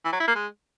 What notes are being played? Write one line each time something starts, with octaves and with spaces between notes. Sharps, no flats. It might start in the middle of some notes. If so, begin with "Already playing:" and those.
E3
F#3
E4
A#3
G#3